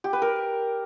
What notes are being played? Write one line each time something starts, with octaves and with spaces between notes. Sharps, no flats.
G4
B4
A#4